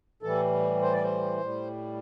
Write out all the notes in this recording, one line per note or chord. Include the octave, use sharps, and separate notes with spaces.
A2 E3 G3 A4
C5
D5
C5
A2 G3